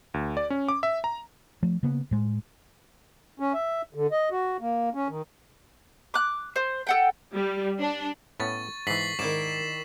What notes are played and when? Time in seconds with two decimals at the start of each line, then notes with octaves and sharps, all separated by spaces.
0.14 D2
0.37 D5
0.50 C#4
0.69 D6
0.83 E5
1.04 A#5
1.63 F3 A3
1.83 C#3 A#3 B3
2.11 A2 G#3
3.40 C#4
3.54 E5
3.94 D3
4.11 D#5
4.31 F#4
4.61 A#3
4.94 C#4
5.08 D#3
6.14 D6 F#6
6.56 C5
6.87 A4 F#5 G5
7.34 G3
7.80 D4
8.40 A2 B3 C#4 C#6 A6
8.87 G#2 E3 B6 C7 F#7
9.19 G#2 D#3 E4 D5 E7